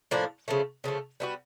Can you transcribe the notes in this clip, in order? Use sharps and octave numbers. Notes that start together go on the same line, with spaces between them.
A2 F3 A#3 D4
C#3 F3 A3
C#3 F3 A3
G3 B3 D#4 F#4